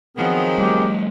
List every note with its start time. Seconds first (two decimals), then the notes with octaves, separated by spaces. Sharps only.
0.17 D#3 F3 F#3 B3 C4 G#4 A#4
0.58 G3 A3 G4